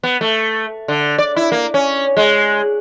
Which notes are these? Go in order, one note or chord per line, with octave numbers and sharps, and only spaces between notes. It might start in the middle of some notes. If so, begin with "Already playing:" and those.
B3
A3
D3
D5
E4
A#3
C#4
G#3